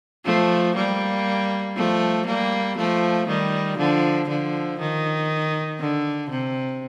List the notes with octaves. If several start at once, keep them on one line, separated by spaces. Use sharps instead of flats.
F3 A3
G3 A#3
F3 A3
G3 A#3
F3 A3
D#3 G3
D3 F3
D3 F3
D#3
D3
C3